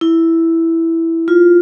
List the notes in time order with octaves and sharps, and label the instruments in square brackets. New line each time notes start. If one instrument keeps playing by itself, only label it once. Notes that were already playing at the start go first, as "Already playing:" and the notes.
[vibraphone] E4
F4